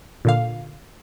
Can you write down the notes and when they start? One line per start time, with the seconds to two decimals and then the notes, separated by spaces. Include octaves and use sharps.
0.25 A#2 D3 F5